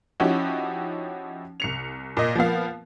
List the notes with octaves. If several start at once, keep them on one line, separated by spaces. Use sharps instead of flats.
F3 C#4 D#4 E4 F#4 G4
C2 C#7 F7
A#2 D#5
F3 A#3 B3 F5